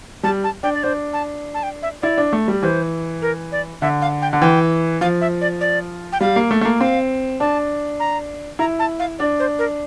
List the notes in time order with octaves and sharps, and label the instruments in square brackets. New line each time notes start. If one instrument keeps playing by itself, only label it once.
[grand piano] G3 [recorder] A5
[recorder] A5
[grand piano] D4 [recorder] G5
[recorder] D5
[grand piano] D4 [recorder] C5
[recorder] A5
A5
G5
E5
[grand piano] E4 [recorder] D5
[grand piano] D4
A3
G3
[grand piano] E3 [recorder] C5
[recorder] A#4
D5
[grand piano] D3 [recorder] E5
[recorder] F5
G5
[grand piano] D3
[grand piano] E3 [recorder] G5
[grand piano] F3 [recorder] F5
[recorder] E5
D5
D5
G5
[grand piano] G3 [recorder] F5
[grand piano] A#3
A3
A3
A#3
[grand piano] C4 [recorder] F5
[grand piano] D4 [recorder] A5
[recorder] A#5
[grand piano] E4 [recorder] A#5
[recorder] A5
F5
[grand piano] D4 [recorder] D5
[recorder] C5
A#4